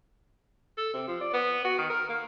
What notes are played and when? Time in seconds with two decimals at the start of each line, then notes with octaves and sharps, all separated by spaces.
0.77 A4
0.93 C3
1.07 F3
1.20 D5
1.33 B3
1.65 F#4
1.78 D#3
1.90 A#4
2.09 A#3